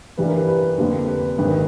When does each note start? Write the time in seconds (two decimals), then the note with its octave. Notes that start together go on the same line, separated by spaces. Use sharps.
0.17 G2 E3 G3 B4
0.28 A#4
0.38 B4
0.48 B4
0.78 F2 D3 G3 A#3
1.08 B4
1.38 G#1 G2 D#3 B4